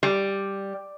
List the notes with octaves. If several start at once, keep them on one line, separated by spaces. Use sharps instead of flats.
G3